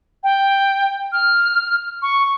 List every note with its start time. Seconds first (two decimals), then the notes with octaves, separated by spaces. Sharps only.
0.23 G5
1.12 F6
2.02 C#6